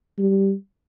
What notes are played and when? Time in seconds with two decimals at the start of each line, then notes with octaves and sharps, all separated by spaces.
0.19 G3